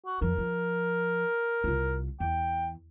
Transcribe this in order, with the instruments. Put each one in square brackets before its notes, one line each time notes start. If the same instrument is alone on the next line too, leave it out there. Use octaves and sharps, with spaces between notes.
[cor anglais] F#4
[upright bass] F2 F3 [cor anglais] A#4
[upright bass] F3
C2 F4
[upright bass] E2 [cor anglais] G5